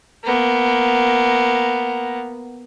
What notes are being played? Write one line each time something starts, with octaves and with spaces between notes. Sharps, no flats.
A#3 B3